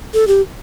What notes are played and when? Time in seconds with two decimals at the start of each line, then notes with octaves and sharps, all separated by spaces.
0.14 A4
0.27 G4